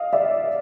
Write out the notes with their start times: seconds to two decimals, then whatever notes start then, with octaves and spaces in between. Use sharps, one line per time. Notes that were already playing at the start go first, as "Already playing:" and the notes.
Already playing: D#5 F5
0.13 D5 E5